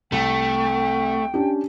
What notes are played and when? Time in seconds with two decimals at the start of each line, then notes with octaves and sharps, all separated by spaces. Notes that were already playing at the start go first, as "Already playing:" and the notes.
0.12 C2 A3 G5
1.34 C#4 D4 G4